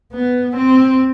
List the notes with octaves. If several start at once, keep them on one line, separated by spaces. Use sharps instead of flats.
B3
C4